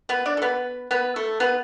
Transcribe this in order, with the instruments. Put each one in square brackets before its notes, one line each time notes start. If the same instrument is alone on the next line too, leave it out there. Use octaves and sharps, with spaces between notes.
[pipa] B3 B4
D4 D5
A4
B3 B4
B3 B4
A3 A4
B3 B4